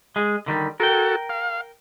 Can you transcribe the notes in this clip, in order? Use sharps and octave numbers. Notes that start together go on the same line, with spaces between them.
G#3 G#4
D3 D#3 G3
F#4 A4 A#4 G5
F5